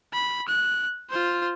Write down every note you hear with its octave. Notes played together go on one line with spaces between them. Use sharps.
B5
F#6
F4 C5